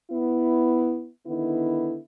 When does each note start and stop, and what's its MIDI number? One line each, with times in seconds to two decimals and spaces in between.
0.11 1.09 59
0.11 1.09 64
1.26 1.98 50
1.26 1.98 51
1.26 1.98 59
1.26 1.98 64